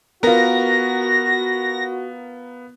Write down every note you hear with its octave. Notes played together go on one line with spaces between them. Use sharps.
B3 F4 F#4 A#4 A#6